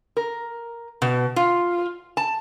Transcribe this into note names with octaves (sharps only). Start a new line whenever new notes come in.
A#4
B2
F4
A5